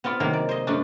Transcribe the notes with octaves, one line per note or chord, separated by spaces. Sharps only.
B3 C4 F4 D5
C3 D#3 F#3 A#3
D5
C5 D#5
F#2 A3 D4